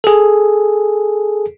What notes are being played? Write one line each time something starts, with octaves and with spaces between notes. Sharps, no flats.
G#4 A4